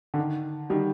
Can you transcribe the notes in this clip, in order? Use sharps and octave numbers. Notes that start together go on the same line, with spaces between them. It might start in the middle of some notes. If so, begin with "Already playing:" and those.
D3
D#3
D#3 G3